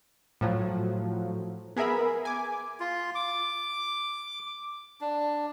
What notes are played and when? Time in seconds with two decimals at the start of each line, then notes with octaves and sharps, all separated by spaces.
0.41 A2 F3 F#3
1.76 B3 G#4 A#4 E5 B5
2.25 G#5 D6
2.80 F4
3.15 D6
5.01 D4